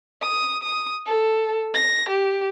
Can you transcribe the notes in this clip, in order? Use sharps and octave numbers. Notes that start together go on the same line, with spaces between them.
D#6
D#6
A4
A#6
G4